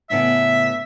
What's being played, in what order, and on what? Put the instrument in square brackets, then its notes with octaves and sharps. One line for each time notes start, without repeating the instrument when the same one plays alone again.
[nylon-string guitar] A2 C#3 B3 [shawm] E5